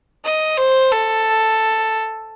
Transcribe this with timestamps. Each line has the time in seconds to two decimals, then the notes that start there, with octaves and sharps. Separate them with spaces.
0.24 D#5
0.57 C5
0.92 A4